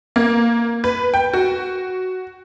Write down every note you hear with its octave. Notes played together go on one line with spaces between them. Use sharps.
A#3
B4
G5
F#4